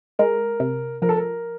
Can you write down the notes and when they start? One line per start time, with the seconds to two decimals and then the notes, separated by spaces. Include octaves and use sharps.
0.19 G#3 A#4
0.60 C3
1.02 F3 A#4
1.09 A4
1.16 A#4